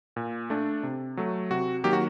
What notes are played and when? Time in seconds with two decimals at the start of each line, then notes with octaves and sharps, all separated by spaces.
0.16 A#2
0.50 A3 D4
0.83 C3
1.17 F#3 A3
1.51 C3 F#4
1.84 D#3 F#3 A#3 G4
1.93 F#4